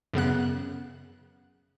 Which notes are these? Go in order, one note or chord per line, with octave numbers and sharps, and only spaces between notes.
F#2 C#3 B3 F#6